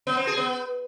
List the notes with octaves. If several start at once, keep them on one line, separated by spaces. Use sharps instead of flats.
B3
C4
G#4
B3